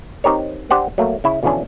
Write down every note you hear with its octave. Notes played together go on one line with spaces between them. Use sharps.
C4 D#4 G4 A#4 C#5
D4 G4 C5 F#5
F#3 A3 A#3
C#3 E4
B2 D3 E3 F3 C#4 D4